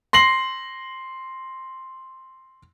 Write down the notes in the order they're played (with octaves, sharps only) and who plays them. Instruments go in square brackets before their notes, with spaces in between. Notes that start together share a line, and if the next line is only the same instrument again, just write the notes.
[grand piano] C6 A#6 C7 F#7